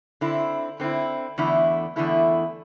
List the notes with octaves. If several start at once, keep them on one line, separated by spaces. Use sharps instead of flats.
D3 C4 E4
D3 C4 E4
E2 D3 A3 E4
E2 D3 A3 E4